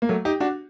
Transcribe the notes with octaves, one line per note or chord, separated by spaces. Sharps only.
A#3
F#3 A3
D#4 G4
D4 F#4